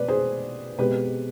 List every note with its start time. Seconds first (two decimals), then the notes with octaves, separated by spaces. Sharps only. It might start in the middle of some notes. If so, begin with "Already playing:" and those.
Already playing: B2 B3 B4 D5
0.08 G#4 C5
0.78 B2 G#3 C4 G4 B4